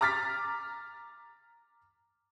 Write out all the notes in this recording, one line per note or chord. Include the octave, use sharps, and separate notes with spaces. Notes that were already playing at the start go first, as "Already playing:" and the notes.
A#5 D6 F6 A6 B6